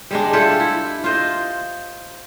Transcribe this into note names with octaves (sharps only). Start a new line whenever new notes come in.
G3 G#3 D4
E4 F4 G4 A4
E4
F4 C5 D#5